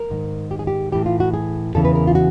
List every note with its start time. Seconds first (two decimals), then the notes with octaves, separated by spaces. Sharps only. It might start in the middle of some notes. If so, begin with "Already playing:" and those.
Already playing: A#4
0.10 G#2 D#3
0.51 G4
0.59 G#4
0.67 G4
0.92 A2 E3 G4
1.06 F4
1.20 F#4
1.34 G#4
1.75 E2 C#3 E3 A4
1.85 B4
1.95 A#4
2.07 F4
2.15 F#4